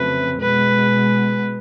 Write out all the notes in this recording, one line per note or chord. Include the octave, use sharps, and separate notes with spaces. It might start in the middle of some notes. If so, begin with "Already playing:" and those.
Already playing: F2 C#3 F#3 A3 C4 B4
B2 G#3 B3 B4